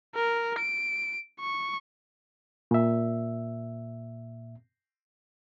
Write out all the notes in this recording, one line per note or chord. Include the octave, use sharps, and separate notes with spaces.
A#4
D7
C#6
A#2 E5